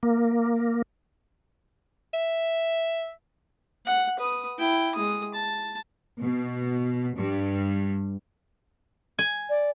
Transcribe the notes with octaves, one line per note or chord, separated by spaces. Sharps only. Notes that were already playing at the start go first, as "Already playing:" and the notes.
A#3
E5
F#5
B4 D#6
E4 G5
G#3 D#6
A5
B2
G2
G#5
D5